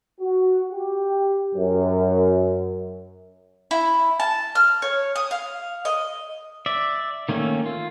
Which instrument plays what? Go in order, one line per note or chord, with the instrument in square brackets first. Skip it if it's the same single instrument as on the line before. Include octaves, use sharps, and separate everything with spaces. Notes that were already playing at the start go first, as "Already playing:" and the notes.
[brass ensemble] F#4
G4
F#2
[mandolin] E4
A5
F6
C#5
D#6
F5
D#5
[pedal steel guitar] D5 E5
D#3 A3 A#3 C#4
F4